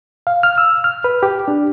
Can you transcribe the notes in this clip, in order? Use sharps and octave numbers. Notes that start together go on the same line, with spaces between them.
F5
F6
E6
F6
B4
G4
D4